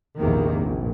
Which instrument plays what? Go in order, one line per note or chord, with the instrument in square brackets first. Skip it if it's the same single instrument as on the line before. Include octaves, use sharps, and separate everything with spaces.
[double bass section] A#1 E2 C3 D#3 A#3
A#1